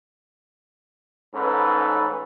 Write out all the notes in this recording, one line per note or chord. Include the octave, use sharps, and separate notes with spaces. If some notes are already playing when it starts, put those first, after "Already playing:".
A1 G#2 C#4 D#4 A4 B4